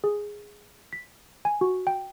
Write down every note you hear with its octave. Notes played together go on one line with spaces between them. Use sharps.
G#4
B6
G#5
F#4
G5